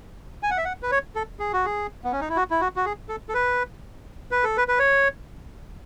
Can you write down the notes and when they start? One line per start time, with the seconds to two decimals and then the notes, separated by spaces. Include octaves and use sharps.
0.43 G#5
0.50 F#5
0.57 E5
0.65 F#5
0.82 B4
0.91 C#5
1.16 A4
1.40 G#4
1.53 F#4
1.65 G#4
2.04 B3
2.12 C#4
2.21 D#4
2.29 E4
2.36 F#4
2.50 E4
2.61 F#4
2.76 F#4
2.85 G#4
3.09 A4
3.29 A4
3.34 B4
4.31 B4
4.44 A4
4.57 B4
4.68 B4
4.79 C#5